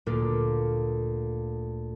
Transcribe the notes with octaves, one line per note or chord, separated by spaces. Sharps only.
D2 A#2 A#3 F6